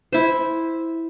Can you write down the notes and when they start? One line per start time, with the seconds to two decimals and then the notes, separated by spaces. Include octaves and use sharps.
0.12 E4 C5